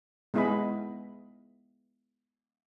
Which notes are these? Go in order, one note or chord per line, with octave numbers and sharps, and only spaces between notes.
G#3 B3 E4 G#4 D#5 B5